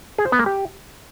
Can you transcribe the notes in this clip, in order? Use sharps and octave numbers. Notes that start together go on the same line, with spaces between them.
G#4
C5
B3
A#3
G4